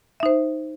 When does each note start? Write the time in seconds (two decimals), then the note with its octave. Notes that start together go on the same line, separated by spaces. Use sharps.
0.20 E5
0.23 D#4
0.26 C5